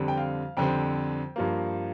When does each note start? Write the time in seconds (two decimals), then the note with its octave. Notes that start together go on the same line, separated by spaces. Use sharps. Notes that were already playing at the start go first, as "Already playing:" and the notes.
Already playing: F2 D3 G3 C4
0.08 G5
0.17 F5
0.57 F2 D3 G3 C4 G5
1.36 G2 F3 A#3